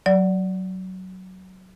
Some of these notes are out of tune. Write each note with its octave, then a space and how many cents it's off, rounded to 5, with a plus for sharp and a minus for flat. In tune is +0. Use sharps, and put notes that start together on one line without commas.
F#3 +10 D5 -15